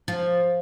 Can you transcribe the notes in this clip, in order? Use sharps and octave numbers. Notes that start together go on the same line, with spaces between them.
F3